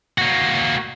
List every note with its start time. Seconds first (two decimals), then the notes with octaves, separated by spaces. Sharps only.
0.18 A#3 F#4